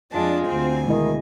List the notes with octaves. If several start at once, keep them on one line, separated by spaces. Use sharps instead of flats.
F2 G#3 D4 F4 A5
D2 C4 G#5
B2 D#3 G#3 E4 D#5